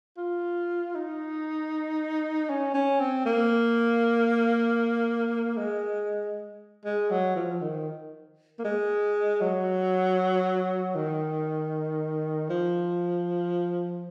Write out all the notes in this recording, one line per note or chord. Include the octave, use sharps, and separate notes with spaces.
F4
D#4
C#4
C#4
C4
A#3
G#3
G#3
F#3
F3
D#3
A#3
G#3
F#3
D#3
F3